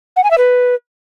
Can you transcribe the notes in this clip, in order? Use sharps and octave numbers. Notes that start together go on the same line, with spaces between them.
F#5
G#5
E5
B4